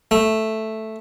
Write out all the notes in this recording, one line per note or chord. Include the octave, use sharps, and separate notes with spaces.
A3